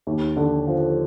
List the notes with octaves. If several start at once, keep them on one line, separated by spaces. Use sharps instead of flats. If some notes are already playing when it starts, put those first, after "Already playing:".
D#2
D3
F3